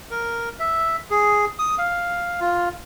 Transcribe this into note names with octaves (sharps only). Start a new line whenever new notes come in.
A#4
E5
G#4
D#6
F5
F4